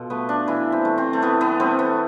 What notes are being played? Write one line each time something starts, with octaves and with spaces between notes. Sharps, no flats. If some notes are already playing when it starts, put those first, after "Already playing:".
Already playing: B2 F4 A4
A3 B3
D4
E3 E4
C4
A3
C4
A3
E3 B3
B3
A3 C4
B3